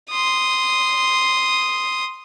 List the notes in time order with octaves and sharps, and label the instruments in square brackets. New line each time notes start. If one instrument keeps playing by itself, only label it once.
[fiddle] C6 D#6